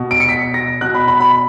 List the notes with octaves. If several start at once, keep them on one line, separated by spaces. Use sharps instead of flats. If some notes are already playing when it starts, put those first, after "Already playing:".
Already playing: B2
D7
C#7
B6
A#6
B2 F#6
B5
B5
B5